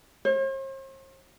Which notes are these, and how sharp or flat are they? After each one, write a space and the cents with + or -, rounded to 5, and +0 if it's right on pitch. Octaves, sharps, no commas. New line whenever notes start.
C5 +45